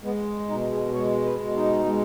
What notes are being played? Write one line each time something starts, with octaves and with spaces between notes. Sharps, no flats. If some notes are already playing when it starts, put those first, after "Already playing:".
G#3 B3
B2 D#4
G#4
G#3 C#5
B4
B2
D#4
G#3